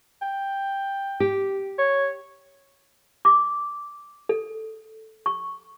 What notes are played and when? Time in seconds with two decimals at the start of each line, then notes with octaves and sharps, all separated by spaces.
0.22 G5
1.20 G4
1.79 C#5
3.25 D6
4.29 A4
5.26 C#6